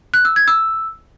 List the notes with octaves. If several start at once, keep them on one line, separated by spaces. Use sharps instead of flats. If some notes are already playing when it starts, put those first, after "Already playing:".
F#6
E6
G#6
E6